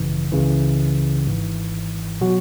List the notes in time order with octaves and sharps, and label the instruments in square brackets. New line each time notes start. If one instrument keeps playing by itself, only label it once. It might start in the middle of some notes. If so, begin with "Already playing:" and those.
Already playing: [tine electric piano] G#1 F#2 C#3 E3
C#2 C#3 E3
G#1 G#2 E3
B2 F#3 F#4